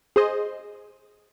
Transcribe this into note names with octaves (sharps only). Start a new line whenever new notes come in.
G#4 C5 D#5